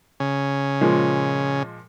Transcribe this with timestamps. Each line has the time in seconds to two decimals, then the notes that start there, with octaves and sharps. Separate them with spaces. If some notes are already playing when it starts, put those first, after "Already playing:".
0.20 C#3 C#4
0.81 A#2 F3 G#3